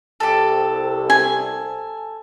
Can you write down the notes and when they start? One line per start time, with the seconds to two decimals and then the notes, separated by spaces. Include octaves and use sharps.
0.20 C2 G4 A4
1.10 G#5